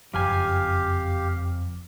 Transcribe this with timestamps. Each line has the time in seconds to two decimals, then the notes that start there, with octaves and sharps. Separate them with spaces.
0.14 F#1 F2 G4 F5 G#5